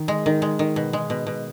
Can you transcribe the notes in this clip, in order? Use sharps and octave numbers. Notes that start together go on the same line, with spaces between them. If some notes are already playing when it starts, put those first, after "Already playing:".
Already playing: D#3
G#3
D#3
G#3
D#3
B2
G#3
B2
B2